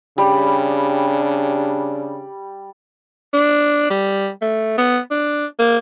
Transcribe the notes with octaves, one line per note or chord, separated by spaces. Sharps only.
C#3 G3 D4
D4
G3
A3
B3
D4
A#3